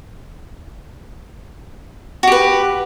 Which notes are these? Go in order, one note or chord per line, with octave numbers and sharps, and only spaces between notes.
F#4 G4 B4